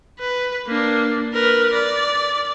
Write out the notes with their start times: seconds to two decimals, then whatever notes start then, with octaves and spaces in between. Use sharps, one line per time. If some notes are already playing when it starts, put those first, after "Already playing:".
0.20 B4
0.67 A#3 D4
1.33 A#4 B4
1.73 D5